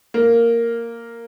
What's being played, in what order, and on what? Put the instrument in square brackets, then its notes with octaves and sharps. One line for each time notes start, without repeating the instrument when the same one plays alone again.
[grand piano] A#3